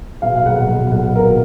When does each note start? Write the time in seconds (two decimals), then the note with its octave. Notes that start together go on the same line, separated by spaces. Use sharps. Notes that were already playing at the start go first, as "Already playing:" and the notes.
0.22 B2 F5
0.36 F5
0.46 B1 F#5
0.68 B2
0.91 B1 F#5
1.15 B2 A#4